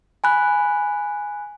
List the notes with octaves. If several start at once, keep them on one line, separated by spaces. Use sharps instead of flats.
G#5 B5 F#6